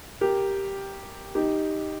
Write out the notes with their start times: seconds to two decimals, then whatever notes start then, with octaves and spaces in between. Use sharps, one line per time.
0.21 G4 A#4
1.35 D#4 G4